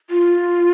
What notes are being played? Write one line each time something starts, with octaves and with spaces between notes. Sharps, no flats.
F4